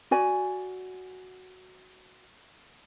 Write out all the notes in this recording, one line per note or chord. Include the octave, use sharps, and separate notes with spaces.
F#4 D5 G#5